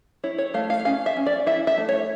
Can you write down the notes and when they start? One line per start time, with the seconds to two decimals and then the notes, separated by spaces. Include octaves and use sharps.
0.24 E4 C#5
0.38 C#5
0.54 A3 F5
0.70 F5
0.85 C#4 F5
1.06 E5
1.17 C#4
1.26 D5
1.46 E4 E5
1.67 E5
1.78 A3
1.89 C#5